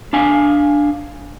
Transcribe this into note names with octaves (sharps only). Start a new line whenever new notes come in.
D4 F5 G#5